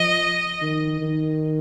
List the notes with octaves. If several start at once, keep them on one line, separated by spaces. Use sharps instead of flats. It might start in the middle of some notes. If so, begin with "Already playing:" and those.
Already playing: F3 D#5
D#3
D#3